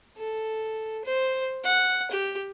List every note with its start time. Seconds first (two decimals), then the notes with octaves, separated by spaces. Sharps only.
0.17 A4
1.05 C5
1.64 F#5
2.11 G4